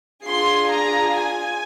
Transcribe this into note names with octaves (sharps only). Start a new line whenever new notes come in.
D4 F4 G#4 C6
A#5
G#5